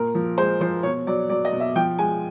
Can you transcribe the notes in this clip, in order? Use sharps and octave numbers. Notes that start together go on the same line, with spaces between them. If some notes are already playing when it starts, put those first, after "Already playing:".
Already playing: A#2 A#4
F3
G#3 C5
F3 C5
B2 C#5
F#3 D5
F#3 D5
D#5
B2
E5
F3 G5
G#3 G#5